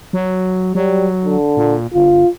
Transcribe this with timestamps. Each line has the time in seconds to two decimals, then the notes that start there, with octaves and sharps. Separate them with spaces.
0.13 F#3
0.75 F#3 G3
1.24 D3
1.57 A#2
1.94 G1 F4